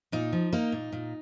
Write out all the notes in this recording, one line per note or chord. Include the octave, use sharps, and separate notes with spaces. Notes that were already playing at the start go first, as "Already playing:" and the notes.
A#2 D#4
F3
A#3 D#4
A#2
A#2